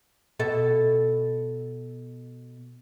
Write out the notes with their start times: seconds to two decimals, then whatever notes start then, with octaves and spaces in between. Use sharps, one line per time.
0.39 B2 A4 E5